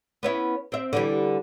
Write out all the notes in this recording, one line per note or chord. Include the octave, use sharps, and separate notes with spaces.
B3 C#4 E4
C4 E5
D3 E3 G3